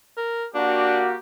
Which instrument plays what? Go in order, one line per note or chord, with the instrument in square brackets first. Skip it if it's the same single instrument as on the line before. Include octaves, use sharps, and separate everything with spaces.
[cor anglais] A#4
[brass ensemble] A#3 F#4 G4 [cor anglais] D4